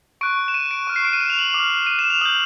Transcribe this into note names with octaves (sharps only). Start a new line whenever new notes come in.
C#6 F#6 D7
E7
D#7
D7
C#6 F6
C7
D7
D#7
E7
F7
F#7
F7
D6
F6
D#7
E7
F7
D#6 G6 F#7